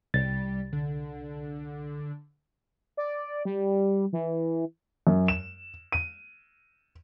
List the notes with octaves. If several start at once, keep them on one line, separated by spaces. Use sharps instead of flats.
C2 G3 A6
D3
D5
G3
E3
F#2
E7
D#7